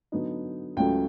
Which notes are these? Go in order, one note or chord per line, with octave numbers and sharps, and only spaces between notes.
D3 F#3 B3 D#4
C#2 C#3 F#3 A3 G5